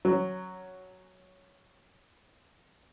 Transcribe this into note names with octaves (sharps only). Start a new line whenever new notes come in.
F#3 C#4